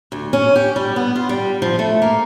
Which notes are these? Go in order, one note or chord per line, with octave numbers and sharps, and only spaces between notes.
D2
C#4
G4
G3
B3
F4
G3
F3
A3
A#3